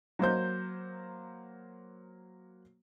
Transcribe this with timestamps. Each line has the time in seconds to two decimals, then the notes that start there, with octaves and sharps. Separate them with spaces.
0.19 F#3 A#3 C5 G6